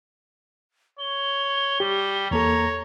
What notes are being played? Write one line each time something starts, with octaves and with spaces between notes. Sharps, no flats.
C#5 G7
G3 G4
E2 A#3 A4 C#5 A#5